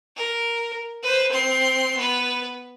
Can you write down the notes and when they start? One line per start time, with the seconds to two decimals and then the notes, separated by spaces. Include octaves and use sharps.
0.17 A#4
1.03 B4 C5
1.32 C4 C6
1.96 B3 B4